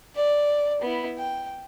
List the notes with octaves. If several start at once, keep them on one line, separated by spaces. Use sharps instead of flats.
D5
B3 E4
G5